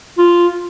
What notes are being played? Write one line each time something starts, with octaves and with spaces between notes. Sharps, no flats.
F4